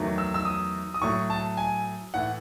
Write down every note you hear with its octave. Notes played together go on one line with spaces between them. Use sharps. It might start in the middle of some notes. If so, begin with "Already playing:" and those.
Already playing: E2 D#3 F#3 A3
E6
E6
D#6
D#6
A2 F#3 A3 C#6
A5
G#5
A2 E3 A3 F#5